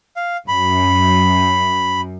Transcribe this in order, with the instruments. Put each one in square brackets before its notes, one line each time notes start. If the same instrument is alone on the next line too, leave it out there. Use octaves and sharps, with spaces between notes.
[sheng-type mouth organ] F5
[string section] F#2 [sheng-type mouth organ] B5